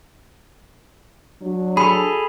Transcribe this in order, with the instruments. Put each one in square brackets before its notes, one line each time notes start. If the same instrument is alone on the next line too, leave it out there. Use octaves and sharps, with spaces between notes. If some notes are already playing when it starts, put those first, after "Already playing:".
[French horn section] F#3 D4
[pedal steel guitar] G#4 A4 [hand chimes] B5